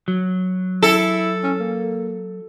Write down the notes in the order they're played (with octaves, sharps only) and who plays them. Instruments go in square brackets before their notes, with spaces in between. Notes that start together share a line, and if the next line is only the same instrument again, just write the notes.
[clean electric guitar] F#3
[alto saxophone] E4 [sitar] A4
[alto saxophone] C#4
A#3